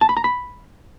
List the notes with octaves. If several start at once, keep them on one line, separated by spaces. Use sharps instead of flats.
A5
B5
A#5
B5